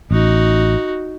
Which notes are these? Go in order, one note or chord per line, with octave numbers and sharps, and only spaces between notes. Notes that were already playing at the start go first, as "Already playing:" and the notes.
A1 D#4 F#4